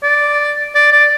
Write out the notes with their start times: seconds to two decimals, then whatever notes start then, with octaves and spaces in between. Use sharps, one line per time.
0.03 D5
0.75 D5
0.92 D5